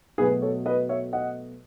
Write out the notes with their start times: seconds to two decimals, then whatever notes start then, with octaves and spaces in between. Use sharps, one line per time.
0.18 B2 F#3 A3 G#4 B4
0.42 A4 C#5
0.66 B4 D#5
0.89 C#5 E5
1.13 D#5 F#5